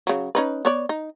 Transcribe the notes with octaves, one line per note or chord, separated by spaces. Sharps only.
C#3 F#3
C#4 D#4 B4
B3 C#5 D5
D#4